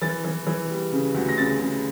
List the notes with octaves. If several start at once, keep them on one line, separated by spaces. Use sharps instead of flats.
E3 A6
E3
E3
G3
C#3
D2
A#6
C#3 A6
C#3